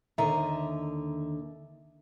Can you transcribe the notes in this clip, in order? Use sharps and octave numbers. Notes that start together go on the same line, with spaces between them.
D#2 D3 D#3 D#5 E5 A#5